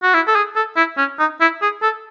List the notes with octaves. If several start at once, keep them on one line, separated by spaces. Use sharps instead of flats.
F#4
E4
A4
G#4
A4
E4
C#4
D#4
E4
G#4
A4